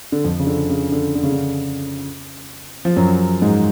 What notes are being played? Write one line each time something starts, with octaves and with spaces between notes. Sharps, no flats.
D3
F2 F3
C#3
D3
C#3
D3
D3
C#3
D3
F3
F#2 F#3
G#2 G#3